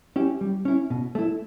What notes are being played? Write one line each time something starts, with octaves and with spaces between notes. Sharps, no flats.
C#4 E4 G4
G3
C#4 E4
B2
A3 E4